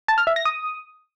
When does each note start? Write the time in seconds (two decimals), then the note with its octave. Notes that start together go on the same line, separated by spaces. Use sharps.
0.08 A5
0.18 F6
0.27 E5
0.36 A#6
0.45 D#6